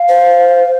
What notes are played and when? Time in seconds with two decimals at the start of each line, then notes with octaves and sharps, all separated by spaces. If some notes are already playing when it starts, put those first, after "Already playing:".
Already playing: F5
0.09 C5